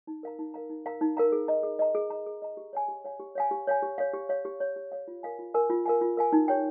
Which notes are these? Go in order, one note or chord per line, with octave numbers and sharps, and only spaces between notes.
D#4
A#4 F5 A#5
D#4
A#4 F5 A#5
D#4
A#4 F5 A#5
D#4
A#4 F5 A#5
G#4
D#5 A#5
G#4
D#5 A#5
G#4
D#5 A#5
G#4
D#5 A#5
G4
C#5 F5 G#5
G4
C#5 F5 G#5
G4
C#5 F5 G#5
G4
C#5 F5 G#5
G4
C#5 F5
G4
C#5 F5
G4
C#5 F5
G4
C#5 F5
F4
A#4 F5 G#5
F4
A#4 F5 G#5
F4
A#4 F5 G#5
F4
A#4 F5 G#5
D#4
G4 C#5 G5